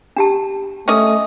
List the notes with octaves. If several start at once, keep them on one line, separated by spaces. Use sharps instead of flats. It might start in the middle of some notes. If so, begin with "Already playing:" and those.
D4 G4 A5
A3 C#4 D#5